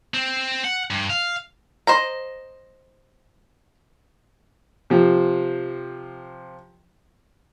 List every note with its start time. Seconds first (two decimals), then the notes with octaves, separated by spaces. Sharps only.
0.14 C4
0.64 F#5
0.90 G2
1.10 F5
1.87 C5 D#5 A#5
4.90 C3 F3